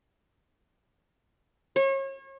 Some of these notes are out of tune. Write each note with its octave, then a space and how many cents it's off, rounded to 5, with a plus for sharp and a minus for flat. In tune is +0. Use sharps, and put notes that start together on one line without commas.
C#5 -35